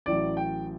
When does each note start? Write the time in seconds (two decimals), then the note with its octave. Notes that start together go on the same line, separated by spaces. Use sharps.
0.06 A1 A2 F#3 D5
0.37 G5